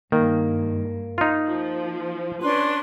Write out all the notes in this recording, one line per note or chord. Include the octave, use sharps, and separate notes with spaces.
G2 D#3 A#3
D#4 F4
F3
C#4 D4 B4 C6